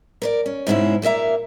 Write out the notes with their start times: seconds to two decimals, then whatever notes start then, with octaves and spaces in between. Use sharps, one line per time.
0.22 A#4 B4 D5
0.46 C#4
0.67 G#2 B2 G#3 C4 C#4 E4
1.02 A#2 A#3 E4 E5 A#5